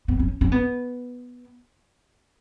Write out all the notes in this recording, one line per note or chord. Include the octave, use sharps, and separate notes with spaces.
B3
C#4
C#4
B3